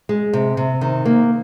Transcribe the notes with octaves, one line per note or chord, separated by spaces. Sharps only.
G#3
C3
C3
D#3
A#3